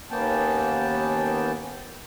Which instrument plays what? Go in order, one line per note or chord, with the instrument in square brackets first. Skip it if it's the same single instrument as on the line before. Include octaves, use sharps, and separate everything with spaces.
[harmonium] D#2 A#3 B3 C#4 G5 A5